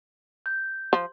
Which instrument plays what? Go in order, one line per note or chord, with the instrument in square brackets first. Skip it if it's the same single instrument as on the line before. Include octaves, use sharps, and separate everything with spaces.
[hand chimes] G6
[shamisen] F3